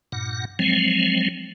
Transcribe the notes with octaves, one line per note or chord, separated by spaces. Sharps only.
G2 A#2 F#5
F3 F#3 G#3 C4